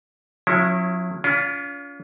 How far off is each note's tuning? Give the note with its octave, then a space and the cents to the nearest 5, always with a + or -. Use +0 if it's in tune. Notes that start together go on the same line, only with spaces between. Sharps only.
F#3 -40 C#4 -20 E4 +15
C#4 +45 F4 +10